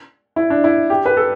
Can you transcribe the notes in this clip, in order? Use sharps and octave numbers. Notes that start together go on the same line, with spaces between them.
E4
D4
E4
G4
B4
A4